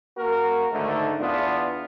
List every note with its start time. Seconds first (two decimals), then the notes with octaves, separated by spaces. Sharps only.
0.16 A#3 F#4 A#4
0.72 G#2 D3 D#3 A3
1.20 E2 B3 D4 F4